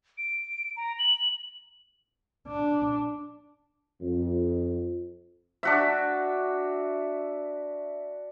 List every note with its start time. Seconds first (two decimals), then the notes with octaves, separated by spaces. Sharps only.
0.18 D7
0.77 A#5
0.99 F#7
2.47 D4
4.01 F2
5.63 D4 F#4 E5